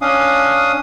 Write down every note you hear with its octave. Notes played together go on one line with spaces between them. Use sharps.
C#4 D4 F5 D#6